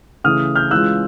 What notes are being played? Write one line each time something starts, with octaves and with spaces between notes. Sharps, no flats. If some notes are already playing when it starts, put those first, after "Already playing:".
C#3 E3 A3 D#6 F6
F6 G6
E3 G#3 C#4 F4 E6 F#6